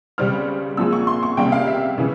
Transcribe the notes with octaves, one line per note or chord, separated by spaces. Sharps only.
C#2 C#3 G3 C4 F6
A#2 F3 G#3 E6
C#6
C6
C#6
C#2 C3 G3 A#3 G5
F5
E5
C#3 E3